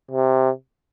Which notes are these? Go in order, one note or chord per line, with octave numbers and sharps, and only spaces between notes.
C3